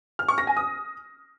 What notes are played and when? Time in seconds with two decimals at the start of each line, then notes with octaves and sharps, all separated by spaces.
0.19 F6
0.28 C#6
0.38 A#6
0.47 G#5
0.57 D#6